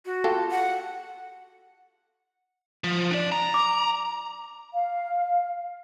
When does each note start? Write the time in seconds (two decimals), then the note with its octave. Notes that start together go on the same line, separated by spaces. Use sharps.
0.06 F#4
0.24 F4 G4 A4
0.51 F#5
2.84 F3
3.11 D4 D5
3.32 A#5
3.54 D6
4.73 F5